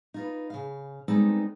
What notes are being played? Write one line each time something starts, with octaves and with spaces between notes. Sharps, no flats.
D#4 F4 B4
C#3 F5
G3 G#3 B3 C4 D#4 A4